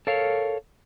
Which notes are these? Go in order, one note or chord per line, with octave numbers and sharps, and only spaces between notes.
A4 A#4 C#5 F5